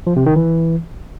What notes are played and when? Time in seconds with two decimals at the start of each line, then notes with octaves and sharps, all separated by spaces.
0.07 F3
0.16 C3
0.26 D#3
0.36 E3